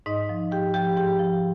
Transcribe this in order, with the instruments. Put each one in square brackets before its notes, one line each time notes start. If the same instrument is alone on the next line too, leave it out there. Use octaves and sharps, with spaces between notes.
[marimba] G#2 D#4 D#5
F3
G#2 G4 G5
F3 G4 G5
G#2 G4 G5
F3